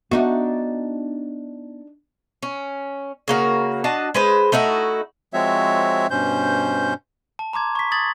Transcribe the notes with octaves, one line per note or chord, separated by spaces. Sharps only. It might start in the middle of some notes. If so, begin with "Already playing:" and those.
B3 D4 D#4 F#4
C#4
C#3 A#3 F#4
D4 F#4 D#5 A5
G#3 B4 C5
A3 D#4 E4 F#4
F3 G#3 C4 F#4 C#5 E5
G2 B2 C#4 C5 G6
A5
A#5 C6 D6 G#6
C#6 B6
D#6 G#6 A6 F#7